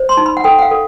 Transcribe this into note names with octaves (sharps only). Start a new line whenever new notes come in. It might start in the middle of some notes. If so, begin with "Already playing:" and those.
Already playing: C5
C6
D#4
B5
F#5
A4 G5
F#5
F5
A4